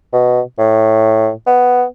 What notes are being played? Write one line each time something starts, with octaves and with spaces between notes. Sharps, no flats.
B2
A2
B3